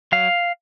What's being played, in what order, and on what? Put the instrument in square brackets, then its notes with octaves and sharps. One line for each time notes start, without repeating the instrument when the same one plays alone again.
[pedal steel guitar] F#3 F5